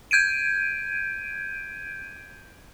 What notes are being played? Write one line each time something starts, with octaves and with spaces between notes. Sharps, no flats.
G6 G#6 D7 D#7